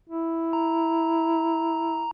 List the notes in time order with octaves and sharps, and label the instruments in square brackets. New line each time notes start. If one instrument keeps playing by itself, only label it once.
[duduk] E4
[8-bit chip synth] A#5